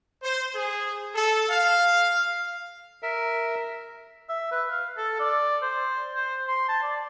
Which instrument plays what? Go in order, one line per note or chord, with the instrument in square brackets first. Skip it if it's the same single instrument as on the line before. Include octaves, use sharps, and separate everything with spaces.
[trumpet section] C5
G#4
A4
F5
[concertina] A#4 E5
[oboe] E5
B4
F5
A4
D5
C5
C5
C6
A5
D5